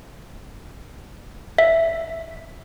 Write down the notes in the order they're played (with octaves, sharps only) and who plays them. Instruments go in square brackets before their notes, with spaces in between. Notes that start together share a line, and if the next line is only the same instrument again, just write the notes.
[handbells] E5